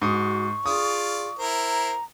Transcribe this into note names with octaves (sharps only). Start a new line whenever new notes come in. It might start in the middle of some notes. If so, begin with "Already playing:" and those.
G#2 F#4 C#6 D#6
F4 G#4 D5 D#6
E4 A#4 C5 A#5